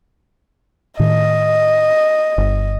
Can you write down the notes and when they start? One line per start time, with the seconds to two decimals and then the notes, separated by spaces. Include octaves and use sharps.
0.99 A2 D#3 D#5
2.38 G1